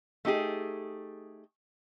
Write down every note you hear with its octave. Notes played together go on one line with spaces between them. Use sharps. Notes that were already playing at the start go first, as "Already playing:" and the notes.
A3 D#4 G4 G#4